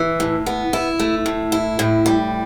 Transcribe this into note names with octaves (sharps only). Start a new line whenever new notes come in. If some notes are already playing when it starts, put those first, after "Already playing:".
Already playing: E3
A2
B3
E4
A3
A2
E4
A2
G3